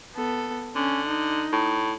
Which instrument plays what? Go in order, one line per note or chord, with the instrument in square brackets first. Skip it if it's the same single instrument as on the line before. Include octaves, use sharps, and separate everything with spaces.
[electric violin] B3 A4
[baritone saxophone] D3 [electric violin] C#4
[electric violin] D#4
[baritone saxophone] A2